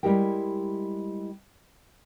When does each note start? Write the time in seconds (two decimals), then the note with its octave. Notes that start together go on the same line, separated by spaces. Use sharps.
0.03 G3 G#3 E4 G4 A#4 G5